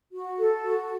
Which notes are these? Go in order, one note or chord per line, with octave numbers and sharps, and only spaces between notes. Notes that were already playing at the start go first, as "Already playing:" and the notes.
F#4
A4
F#4